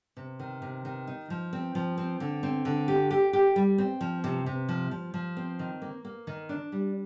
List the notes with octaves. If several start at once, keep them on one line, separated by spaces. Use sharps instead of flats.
C3
D#3
C3
D#3
D#4
F3
C4
F3
C4
D3
C4
D3
G4
G4
G4
G3
C4
F3
C3
C3
F3
F3
F3
C4
D#3
A#3
A#3
D#3
D4
G3